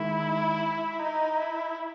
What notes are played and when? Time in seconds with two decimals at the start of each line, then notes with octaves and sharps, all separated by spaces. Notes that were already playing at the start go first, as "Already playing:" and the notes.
Already playing: D#3 G#3 E4
1.00 D#4
1.37 E4